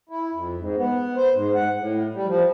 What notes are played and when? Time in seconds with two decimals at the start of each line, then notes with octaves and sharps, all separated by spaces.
0.09 E4
0.33 F2
0.57 G#2
0.77 B3
1.17 C5
1.34 G#2
1.55 F#5
1.78 A2
2.14 G3
2.26 F3